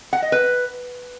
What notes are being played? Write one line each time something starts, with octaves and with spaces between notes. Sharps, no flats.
F#5
D#5
B4